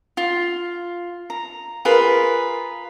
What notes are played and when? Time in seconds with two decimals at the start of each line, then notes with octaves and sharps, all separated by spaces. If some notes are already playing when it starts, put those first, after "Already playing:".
0.17 F4
1.30 A#5
1.85 F4 G#4 A#4 B4